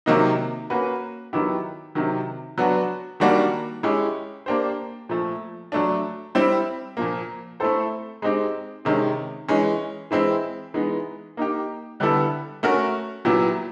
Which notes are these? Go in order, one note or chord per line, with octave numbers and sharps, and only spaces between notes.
C3 D#3 F#3 A#3 D#4
A#3 C#4 F#4 B4
D#3 F#3 B3 E4 G4
C3 D#3 F#3
F#3 B3 D4 F#4
D#3 G3 A#3 D4 F#4
G#3 C#4 E4 G4
A#3 D4 G4 C5
A#2 F3 A3
F#3 A3 D4
G3 C4 E4
A#2 F3 A#3
A3 C4 E4 A4 C5
G#3 C4 D#4 G4
C3 D#3 G#3 C#4
E3 G#3 C#4
E3 G#3 C4 E4
E3 G#3 B3 D#4
A#3 D#4 G4
D3 G3 B3 E4 A4
A3 C#4 F#4 A#4
A#2 F#3 B3 E4 G4